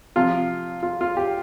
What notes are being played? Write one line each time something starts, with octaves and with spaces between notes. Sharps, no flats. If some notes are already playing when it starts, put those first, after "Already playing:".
C3 F3 F4
F4
F4
G4